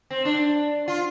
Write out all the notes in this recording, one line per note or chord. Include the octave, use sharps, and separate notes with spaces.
C4
D4
F4